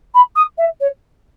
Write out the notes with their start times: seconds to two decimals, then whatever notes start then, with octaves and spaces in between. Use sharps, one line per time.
0.14 B5
0.36 D#6
0.58 E5
0.80 C#5